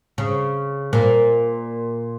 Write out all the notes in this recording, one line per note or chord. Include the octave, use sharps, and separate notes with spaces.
C#3
A#2